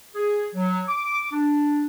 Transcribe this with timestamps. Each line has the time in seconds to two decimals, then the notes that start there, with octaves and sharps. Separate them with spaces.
0.15 G#4
0.55 F#3
0.88 D6
1.32 D4